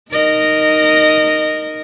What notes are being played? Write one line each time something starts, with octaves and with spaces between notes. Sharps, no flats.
D#4 A#4 D#5